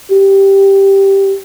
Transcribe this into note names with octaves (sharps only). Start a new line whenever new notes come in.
G4